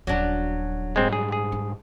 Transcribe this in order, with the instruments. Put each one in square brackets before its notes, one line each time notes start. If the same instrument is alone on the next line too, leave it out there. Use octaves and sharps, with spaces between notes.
[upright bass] D#1 C#4 [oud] F#3 D4
[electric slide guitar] G#2 G3 [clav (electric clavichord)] G#3 C4
[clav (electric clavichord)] G#4
G#4
[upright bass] D4